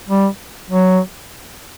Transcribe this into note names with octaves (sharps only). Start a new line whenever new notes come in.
G3
F#3